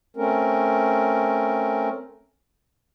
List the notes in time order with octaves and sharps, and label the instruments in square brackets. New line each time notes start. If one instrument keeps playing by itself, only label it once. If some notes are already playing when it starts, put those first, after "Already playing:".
[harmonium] A3 C4 C#4 A#4